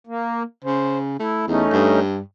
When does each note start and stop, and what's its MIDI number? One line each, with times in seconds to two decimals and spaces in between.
0.07 0.43 58
0.64 1.15 49
0.64 0.98 72
1.20 1.43 57
1.20 1.45 64
1.48 1.64 40
1.48 1.99 57
1.48 1.99 61
1.48 1.99 63
1.72 2.19 43